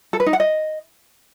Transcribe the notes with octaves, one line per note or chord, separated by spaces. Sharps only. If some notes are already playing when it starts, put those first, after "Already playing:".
A4
B4
D#4
F#5
D#5